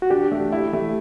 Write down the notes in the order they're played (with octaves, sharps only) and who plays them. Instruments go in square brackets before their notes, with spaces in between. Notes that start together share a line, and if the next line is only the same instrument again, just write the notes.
[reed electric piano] F#4
[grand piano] D4 [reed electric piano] G4
[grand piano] A3
E4
A3